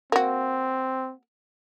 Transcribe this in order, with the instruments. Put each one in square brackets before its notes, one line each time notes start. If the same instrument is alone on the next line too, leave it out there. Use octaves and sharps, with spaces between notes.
[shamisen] A#3 F#4 [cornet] C4